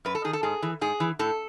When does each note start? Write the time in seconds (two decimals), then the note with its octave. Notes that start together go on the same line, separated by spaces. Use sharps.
0.05 F#2 B4
0.15 A4
0.24 D#3 G#4
0.33 A4
0.43 G#2 G#4
0.63 E3
0.81 G#2 G#4
1.00 E3
1.19 A2 A4